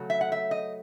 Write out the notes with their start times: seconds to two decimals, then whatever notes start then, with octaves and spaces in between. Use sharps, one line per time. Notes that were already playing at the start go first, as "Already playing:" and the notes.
Already playing: C#3 F#3 A3
0.10 E5
0.21 F#5
0.32 E5
0.51 D#5